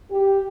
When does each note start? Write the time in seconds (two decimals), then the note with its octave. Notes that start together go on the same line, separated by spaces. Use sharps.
0.12 G4